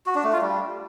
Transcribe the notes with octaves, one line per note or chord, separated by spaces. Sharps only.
F#4
D4
A3
F4
G3